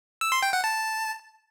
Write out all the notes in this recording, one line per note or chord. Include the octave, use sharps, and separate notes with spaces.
E6
C6
G5
F#5
A5